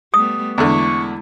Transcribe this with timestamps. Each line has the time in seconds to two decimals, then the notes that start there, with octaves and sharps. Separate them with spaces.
0.14 G3 A3 B3 D#6
0.58 E2 D3 G#3 E4 C#6